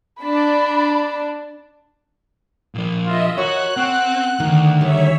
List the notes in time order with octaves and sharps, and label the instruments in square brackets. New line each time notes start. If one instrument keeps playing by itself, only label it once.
[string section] D4 [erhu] B5
[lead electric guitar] A#2 F3
[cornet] F4 [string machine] D#5 E5
[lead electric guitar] F#4 [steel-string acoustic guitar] A#4 [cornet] C#5 [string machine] F#6
[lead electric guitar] C4 [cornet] F#5
[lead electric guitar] D2 [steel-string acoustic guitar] D#3
[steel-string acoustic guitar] D#3 G3 [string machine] C#5 E5